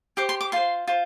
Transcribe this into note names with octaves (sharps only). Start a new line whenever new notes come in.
G4 C5 D6
C6
D6
F4 C5 C6
F4 C5